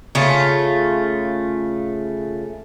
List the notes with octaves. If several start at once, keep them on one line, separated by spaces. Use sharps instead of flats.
C#3 A3 F4